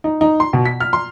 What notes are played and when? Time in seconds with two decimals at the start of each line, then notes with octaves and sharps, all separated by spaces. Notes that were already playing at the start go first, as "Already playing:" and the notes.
0.04 D#4
0.21 D#4
0.40 C6
0.53 B2
0.65 B6
0.80 F6
0.93 C6